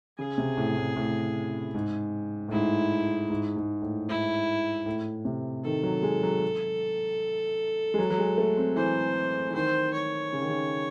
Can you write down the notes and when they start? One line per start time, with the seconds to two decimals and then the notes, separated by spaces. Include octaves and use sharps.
0.18 C#3 G#4
0.38 C3
0.57 A2
0.77 A2
0.96 A2
1.74 G#2
2.48 A2
2.52 G#2 E4
3.30 G#2
3.56 G#2
3.82 A2
4.09 G#2 E4
4.86 A2
5.25 C3
5.64 D#3 A4
5.83 F#3
6.03 G#3
6.23 F#3
7.94 G#3
7.99 F#3
8.10 F#3
8.18 G#3
8.38 A3
8.57 C4
8.76 E3 C5
9.49 E3
9.54 D#3 C5
9.93 C#5
10.33 C#3
10.41 D#3
10.50 C#3